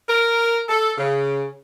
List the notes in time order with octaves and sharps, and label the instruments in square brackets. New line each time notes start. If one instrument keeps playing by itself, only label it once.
[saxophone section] A#4
A4
C#3